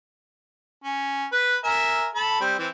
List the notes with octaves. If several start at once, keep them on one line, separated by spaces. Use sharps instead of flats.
C#4
B4
A#4 E5 G#5
A4 A5 B5
G3 C4
E3 C4